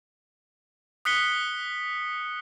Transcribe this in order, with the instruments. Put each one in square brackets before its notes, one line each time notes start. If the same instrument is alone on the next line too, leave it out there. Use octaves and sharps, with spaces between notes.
[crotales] D#6 F#6 B6 C#7 G7